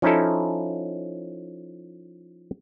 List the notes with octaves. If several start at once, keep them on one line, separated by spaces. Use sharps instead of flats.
F3 C#4 D#4 E4 A4